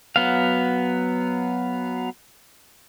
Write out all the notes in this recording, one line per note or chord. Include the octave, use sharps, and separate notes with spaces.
F#3 B3 F5